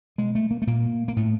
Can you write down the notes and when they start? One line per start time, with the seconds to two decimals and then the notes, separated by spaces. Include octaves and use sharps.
0.18 B2 G#3
0.35 A3
0.51 A#3
0.62 A3
0.67 A#2 A#3
1.08 A#3
1.16 A2 A3